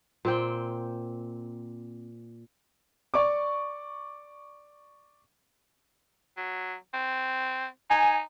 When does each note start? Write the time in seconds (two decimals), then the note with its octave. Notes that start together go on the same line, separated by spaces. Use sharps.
0.25 A#2 C4 G5
3.14 D5 C#6 D6
6.37 F#3
6.93 C4
7.90 D#4 G#5